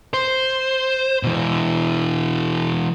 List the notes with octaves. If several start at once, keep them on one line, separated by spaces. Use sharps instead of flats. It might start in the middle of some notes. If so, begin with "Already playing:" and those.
C5
B2 E3